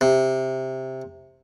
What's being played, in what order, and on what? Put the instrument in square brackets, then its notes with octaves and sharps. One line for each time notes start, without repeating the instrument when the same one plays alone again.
[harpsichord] C3